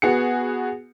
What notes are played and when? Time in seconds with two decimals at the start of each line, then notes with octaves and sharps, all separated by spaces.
0.02 B3 F#4 G#4 C#7